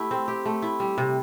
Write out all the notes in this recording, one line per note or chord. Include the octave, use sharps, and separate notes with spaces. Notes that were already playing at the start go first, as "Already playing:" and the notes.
Already playing: A3 E4 G4
C4
G4
A3
E4
G3
C3